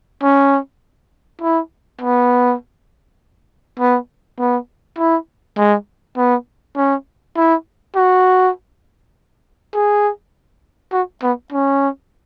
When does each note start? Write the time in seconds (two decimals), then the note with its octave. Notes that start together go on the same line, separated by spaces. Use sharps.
0.23 C#4
1.42 E4
2.01 B3
3.80 B3
4.39 B3
4.98 E4
5.57 G#3
6.17 B3
6.77 C#4
7.37 E4
7.96 F#4
9.74 G#4
10.93 F#4
11.23 B3
11.53 C#4